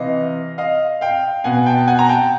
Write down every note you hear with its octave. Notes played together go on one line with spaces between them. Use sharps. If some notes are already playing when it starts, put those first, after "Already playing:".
Already playing: C3 E3 D#5 F5
D#5 F5
F5 G5
B2 F#5 G#5
G5 A5
A5
F#5 G#5
A#5
G5 A5